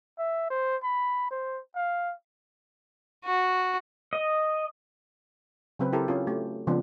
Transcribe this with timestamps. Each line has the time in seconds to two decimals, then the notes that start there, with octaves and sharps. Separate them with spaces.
0.19 E5
0.50 C5
0.83 B5
1.31 C5
1.76 F5
3.25 F#4
4.13 D#5
5.79 C#3 F#3 C4 B4
5.93 E4 G4 A4 A#4 C5
6.08 C#4 F4
6.27 A3 F#4 G4
6.67 C#3 F3 G#3 B3 C4 D4